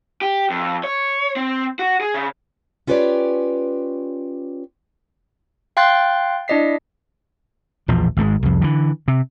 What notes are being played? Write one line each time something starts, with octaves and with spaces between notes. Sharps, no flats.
G4
F2
C#5
C4
F#4
G#4
C#3
C#4 F4 G4 B4 C#5 D5
F5 G5 C6 F#6 A6 C7
D4 E4 D5 D#5 B6 C7
A#1 E2 B2 F3
G#1 G#2 D3 G#3
C2 F2
D3 E3
C3